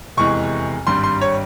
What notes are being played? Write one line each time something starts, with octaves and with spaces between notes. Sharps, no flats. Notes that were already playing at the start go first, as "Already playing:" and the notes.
F1 E2 E3 G#3 C#6
G#1 G2 G3 C6
C6
C#5